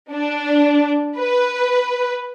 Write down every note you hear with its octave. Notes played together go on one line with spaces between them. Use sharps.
D4
B4